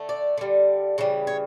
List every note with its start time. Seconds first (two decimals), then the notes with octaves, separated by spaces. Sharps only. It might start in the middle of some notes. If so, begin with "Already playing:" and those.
Already playing: D3 A3
0.09 D5
0.37 D3 G3
0.98 C#3 E3 G3
1.27 C#5